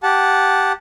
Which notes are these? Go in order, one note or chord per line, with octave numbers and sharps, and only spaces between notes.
G4 F#5 A5